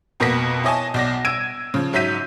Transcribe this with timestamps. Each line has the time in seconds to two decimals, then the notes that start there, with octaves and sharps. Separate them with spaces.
0.20 F2 B2 A#3 B3 A#6 B6
0.64 E4 C#5 D#5 G#5 A5
0.94 B1 D5 A#6
1.25 E6 G#6 D7 D#7
1.74 C#3 F3
1.93 G#2 F#3 E5 G6 B6 D#7